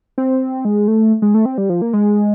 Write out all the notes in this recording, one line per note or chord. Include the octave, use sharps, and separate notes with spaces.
C4
G#3
A3
G#3
A3
C4
G3
F3
A#3
G#3